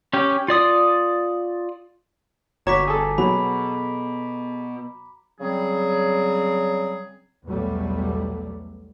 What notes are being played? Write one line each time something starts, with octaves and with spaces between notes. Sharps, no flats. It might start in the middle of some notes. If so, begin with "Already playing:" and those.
C#4 G4
F4 D5 D#6
G1 F#4 C#5 A#5 D6 B6
G#4 A4
B2 F#3 B5
C#3 F#3 G3 C4 G#4
B1 E2 B2 F#3 G3 A3